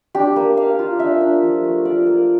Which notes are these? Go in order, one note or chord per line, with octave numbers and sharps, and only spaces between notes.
D4 G4
A#3
A#3 F5
F4
D4 E5
D4
F3
A3
F4 D5
A#3